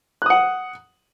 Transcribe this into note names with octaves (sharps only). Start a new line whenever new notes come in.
F#5 D#6 F#6